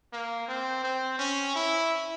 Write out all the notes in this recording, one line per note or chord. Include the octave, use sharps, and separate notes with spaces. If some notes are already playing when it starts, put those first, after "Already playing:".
A#3
C4
C4
C#4
E4